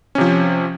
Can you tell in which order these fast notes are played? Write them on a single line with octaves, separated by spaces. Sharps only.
C#4 C3 F3